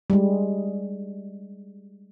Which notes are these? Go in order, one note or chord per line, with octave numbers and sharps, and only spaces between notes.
G3 G#3